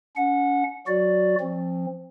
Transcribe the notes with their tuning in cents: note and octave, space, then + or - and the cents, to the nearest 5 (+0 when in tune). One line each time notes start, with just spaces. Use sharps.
C#4 +35 F#5 -20
F#3 +0 F#4 +0 D5 +5
F3 +0 C4 +25